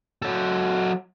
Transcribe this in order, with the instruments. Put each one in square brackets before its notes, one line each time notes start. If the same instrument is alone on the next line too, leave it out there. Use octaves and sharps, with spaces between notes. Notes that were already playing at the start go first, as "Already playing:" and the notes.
[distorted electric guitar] F#3 A4